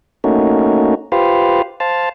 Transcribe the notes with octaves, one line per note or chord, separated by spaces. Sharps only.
A3 A#3 C#4 D#4 F#4
F4 G4 B4 C5 F5
C5 F5 A5